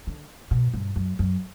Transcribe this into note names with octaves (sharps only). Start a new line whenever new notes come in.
D3
B2
G2
F#2
F#2